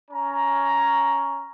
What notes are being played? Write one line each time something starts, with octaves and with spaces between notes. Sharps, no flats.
C#4 A#5